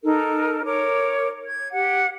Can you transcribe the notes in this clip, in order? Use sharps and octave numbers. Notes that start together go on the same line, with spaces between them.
D#4 A4 A#4
A#4 C#5 D6
G#6
G4 F#5